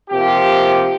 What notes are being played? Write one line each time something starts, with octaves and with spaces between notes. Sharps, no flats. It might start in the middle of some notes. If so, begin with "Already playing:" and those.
C3 F3 A#3 G4